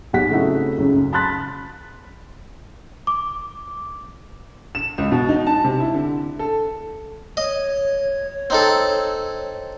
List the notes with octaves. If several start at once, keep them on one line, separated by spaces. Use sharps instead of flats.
B1 G4 F#5 B6
C#3 A3 C4 D#4 E4 F#4
C#2 F#2
A5 B5 C6 F#6 A6 B6
D6
E7
C#2
B2
D#4
A5
C3
E4
D3
A4
C#5 D#5
C4 D#4 A4